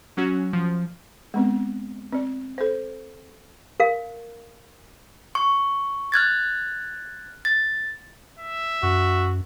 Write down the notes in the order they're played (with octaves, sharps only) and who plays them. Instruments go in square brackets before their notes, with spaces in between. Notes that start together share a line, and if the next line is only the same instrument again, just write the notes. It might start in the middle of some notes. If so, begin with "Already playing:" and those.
[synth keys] F#3 C#4 F#4
F3
[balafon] G#3 B3 C4
C4 D5
A4 C5
[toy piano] A#4 F5
[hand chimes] C#6
F6 F#6 G#6 A6
A6
[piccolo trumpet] E5
[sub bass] F#2 [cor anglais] F#4